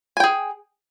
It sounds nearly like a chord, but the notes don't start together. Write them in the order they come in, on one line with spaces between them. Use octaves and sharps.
G#5 G5 G#4